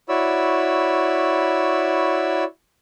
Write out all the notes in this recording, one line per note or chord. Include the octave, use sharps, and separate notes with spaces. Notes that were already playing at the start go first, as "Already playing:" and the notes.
E4 F#4 C#5 D5 B5 E6